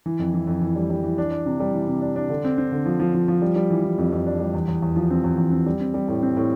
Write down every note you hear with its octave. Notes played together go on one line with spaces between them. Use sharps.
E3
F2
E3
F2
E3
G3
G3
E3
D4
D4
C3
G3
E3
C3
D4
D4
D3
C4
C4
D3
F3
F3
F3
F3
G3
G3
E3
E3
F2
F2
D4
G3
E2
E2
E2
F3
C4
E2
E2
C4
G3
C4
G3
A2
C4
A2